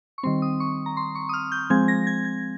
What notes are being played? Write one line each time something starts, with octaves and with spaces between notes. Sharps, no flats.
C#6
D#3 G3 C4 C6
D#6
C#6
A#5
C6
C#6
D#6
F6
G6
F3 G#3 C4 G#6
A#6
G#6
G#6